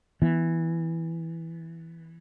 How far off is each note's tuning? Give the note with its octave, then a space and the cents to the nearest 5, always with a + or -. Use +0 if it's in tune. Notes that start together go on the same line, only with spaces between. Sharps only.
E3 +0 B3 +0